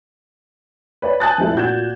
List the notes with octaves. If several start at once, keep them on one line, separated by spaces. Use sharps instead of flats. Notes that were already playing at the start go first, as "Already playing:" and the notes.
B4 C#5 D5
G#5 A5 D#6 F#6 G6 A6
F1 A#1 E4 A4
A#2 F#4 G6 G#6 E7